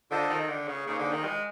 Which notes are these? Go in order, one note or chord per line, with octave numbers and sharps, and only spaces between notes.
D3 F4 A4 C5 D#5
D#3
D3
C#3
C#3 A#3 D#4 G#4 C5
D3
D#3
G#3